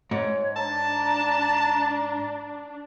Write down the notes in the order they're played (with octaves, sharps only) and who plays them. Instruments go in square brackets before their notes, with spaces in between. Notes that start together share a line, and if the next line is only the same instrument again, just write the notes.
[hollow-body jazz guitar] G#2 [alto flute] C#5
[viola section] D4 [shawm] A5 [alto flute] A#5